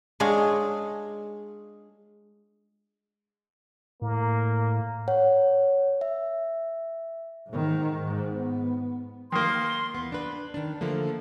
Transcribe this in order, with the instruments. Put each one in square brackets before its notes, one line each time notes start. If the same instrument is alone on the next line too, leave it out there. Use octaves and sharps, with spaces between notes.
[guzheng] G#3 D4 F4 G#4 C#5 F5
[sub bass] A2 [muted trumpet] A#3
[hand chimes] C#5 F#5
E5
[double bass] G#2 D#3
G#2
B3
[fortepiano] D#3 A#3 [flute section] C6
[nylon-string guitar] E2 B3
D4 B4
D#3 D4
D3 F3 A3 A#3